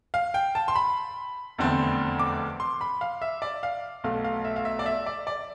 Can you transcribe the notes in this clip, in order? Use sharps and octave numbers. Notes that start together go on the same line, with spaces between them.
F5
G5
A5
C6
B5
F1 E2 D3 A3 C4
D6
C6
B5
F5
E5
D5
F5
B1 B2 A3 F5
F5
E5
F5
E5
D5
E5
D5
D5